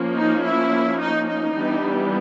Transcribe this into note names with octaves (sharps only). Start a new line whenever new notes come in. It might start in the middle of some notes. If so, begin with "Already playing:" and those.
Already playing: F3 A#3 C#4
D#4
E4
D#4
D#4
E3 G3 B3 D4